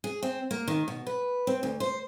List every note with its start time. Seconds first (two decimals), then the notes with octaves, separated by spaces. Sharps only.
0.04 G#4
0.23 C4
0.51 A#3
0.68 D#3
0.88 B2
1.07 B4
1.47 C4
1.63 D2
1.80 C5